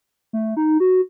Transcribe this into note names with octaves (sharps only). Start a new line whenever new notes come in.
A3
D#4
F#4